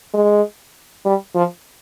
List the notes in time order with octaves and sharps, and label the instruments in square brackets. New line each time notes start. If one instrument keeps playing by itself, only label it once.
[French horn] G#3
G3
F3